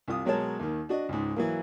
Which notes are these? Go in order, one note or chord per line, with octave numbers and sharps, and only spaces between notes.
C2 F4 D#6
B2 F#3 G#3 A#4 C#5 A5
D#2 D#3
D4 F#4 D#5
C#2 G#2
E3 F#3 A#3